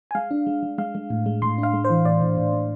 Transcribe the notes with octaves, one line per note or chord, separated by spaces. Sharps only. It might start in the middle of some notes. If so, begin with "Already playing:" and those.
G#5
G#3 F5
D4
G#3
G#3
G#3 F5
G#3
A2
G#3
A2 C6
D4
F5
G#3
C5
E3
A2 D5
A2
A2
A2